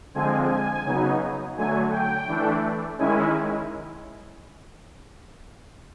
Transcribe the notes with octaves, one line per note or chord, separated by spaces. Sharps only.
D3 F3 G#3 C4 G#5
G#5
C#3 F#3 B3 D#4
D3 F#3 A3 G#5
G5
E3 A3 D4
D#3 G#3 C#4 E4 G#5